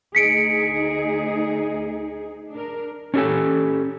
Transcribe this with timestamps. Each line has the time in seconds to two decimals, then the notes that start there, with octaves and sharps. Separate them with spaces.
0.15 D2 D#4 G#4 B6 C#7 D7
2.50 D4 A#4
3.14 C#4 D4 G4 A4 G#5